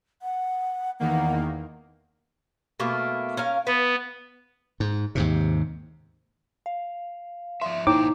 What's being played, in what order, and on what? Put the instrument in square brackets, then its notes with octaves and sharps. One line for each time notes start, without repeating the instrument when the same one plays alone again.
[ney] F#5
[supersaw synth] E2 D#3 A#3 [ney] F#5
[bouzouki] B2 A3 A#3
C#4 A#4 F5
[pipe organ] B3 [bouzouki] B4
[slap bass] G#2
D#2 G#2 C3
[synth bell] F5
[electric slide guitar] F3 D5 E5 [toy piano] C6
[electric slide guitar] A#2 A#3 C5 [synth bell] D#4 [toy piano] E4 C#5 G5 [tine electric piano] D6